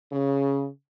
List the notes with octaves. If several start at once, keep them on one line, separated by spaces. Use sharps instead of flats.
C#3